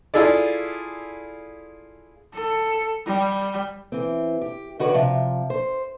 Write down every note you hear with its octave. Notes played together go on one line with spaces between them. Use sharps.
E4 F4 G#4 A4 D5
A4
G3
E3 C4
G4
D#3 F#4 B4 C#5 D5
C3 F3
C5